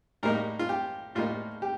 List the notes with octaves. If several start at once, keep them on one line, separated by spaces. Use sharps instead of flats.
A2 G3 A#3 D#4 A#4
F4
G4
A2 G3 A#3 D#4 F4
G4